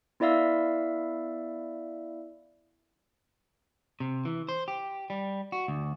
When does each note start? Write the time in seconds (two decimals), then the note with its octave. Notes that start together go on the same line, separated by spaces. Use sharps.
0.20 B3 E4 D5 E5 F5 E6
4.00 C3
4.25 E3
4.49 C5
4.68 G4
5.10 G3
5.52 F#4
5.68 D2